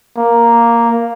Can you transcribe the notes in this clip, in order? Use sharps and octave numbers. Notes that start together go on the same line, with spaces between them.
A#3